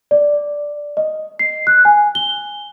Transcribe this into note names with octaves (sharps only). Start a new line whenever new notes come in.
D5
D#5
C7
F#6
G#5
G7